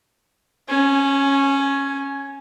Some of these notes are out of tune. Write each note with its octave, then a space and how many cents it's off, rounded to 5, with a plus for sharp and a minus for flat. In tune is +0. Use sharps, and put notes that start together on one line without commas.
C#4 -15 G#5 +10